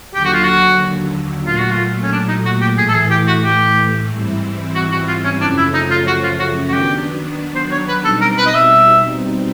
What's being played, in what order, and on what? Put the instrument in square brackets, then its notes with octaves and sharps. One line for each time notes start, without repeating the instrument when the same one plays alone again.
[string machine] D#2 D3 F#3 [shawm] G4
[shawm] F#4
F4
F#4
[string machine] A#2 F#3 A3 [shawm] F4
[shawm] F#4
F4
C#4
D4
D#4
F#4
G4
[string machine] A2 E3 A3 [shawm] G#4
[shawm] A4
G#4
G4
F#4
G4
[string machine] G#2 E3 G3 C4 E4
[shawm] F#4
F#4
F4
C#4
[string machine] F#2 C#3 F3 A3 C#4 [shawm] D4
[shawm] E4
D#4
F4
F#4
F4
F#4
F#4
[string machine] D#3 F#3 B3 D4 [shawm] G4
[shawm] C5
C#5
B4
[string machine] B2 G3 C4 D#4 [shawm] A4
[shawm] A#4
B4
D#5
E5